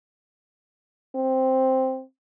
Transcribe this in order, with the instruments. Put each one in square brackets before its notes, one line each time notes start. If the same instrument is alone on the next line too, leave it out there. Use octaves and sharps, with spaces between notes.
[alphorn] C4